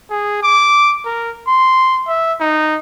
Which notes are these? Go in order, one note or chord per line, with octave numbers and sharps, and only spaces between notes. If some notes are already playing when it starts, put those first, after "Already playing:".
G#4
D6
A#4
C6
E5
D#4